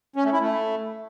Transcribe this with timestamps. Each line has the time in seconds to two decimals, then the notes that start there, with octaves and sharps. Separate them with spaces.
0.16 C#4
0.24 A3
0.33 E4
0.41 A3